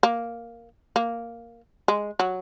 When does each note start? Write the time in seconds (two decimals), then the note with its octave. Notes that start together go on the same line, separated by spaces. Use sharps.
0.03 A#3
0.96 A#3
1.88 G#3
2.20 F#3